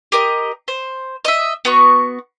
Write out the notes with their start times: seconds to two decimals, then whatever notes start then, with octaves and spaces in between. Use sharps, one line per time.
0.12 G4 A#4 D#5
0.68 C5
1.25 D#5 E5
1.65 B3 F#4 C#6